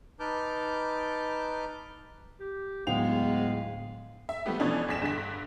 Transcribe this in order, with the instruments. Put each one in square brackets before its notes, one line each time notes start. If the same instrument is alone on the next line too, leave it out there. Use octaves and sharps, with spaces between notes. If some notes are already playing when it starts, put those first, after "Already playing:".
[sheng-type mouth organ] D#4 B4 A5 D6 F6 G6
[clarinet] G4
[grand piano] D1 G5 F7 [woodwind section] G#2 G#3 B3 [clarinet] F5
[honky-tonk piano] E5
F3 G3 A3 B3 G4
B2 E3 F3 C#4 D4 A4
A#1 G#4 B6 E7
G2 D3 B6